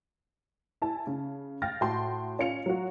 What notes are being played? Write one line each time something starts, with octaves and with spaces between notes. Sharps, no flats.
E4 G#5 A5
C#3
F5 G5 F6 A6 A#6
A2 F#4 G5 A5 C6
C#4 F4 C#7 F7
F#3 F4 F#4